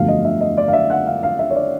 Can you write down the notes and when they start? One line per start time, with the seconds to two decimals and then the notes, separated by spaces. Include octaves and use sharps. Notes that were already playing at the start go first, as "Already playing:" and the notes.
Already playing: G1 F2 D3 F#3 A3 F5
0.08 D#5
0.25 E5
0.41 D#5
0.57 D5
0.68 F5
0.73 E5
0.90 F#5
1.07 F5
1.23 F5
1.39 E5
1.50 C#5
1.56 D5